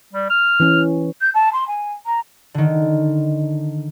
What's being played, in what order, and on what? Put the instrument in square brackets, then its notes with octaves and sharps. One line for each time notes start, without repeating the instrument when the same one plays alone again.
[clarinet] G3
F6
[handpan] E3 C#4
[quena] G6
A5
C6
G#5
A#5
[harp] D3 D#3